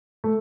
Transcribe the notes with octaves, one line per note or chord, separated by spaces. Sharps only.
A3